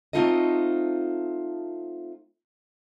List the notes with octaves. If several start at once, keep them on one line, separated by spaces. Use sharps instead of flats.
A3 C4 D#4 F4 A4 D#5